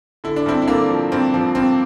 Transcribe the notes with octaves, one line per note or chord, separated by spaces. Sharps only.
D3 E4
D4
G2 C4 E4
E4
D3 A#3 D4
F3
G2 C4
F3
G2 C4